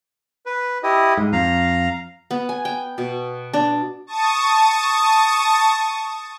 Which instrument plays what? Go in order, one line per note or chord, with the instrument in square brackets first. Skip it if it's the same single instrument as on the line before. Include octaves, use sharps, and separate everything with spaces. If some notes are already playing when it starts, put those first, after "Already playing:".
[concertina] B4
E4 G4 D#5
[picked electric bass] G#2
[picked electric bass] F2 [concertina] F5 A#5
[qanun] B3
G#5
G5
B2
D4
[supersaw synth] A5 C#6 D#6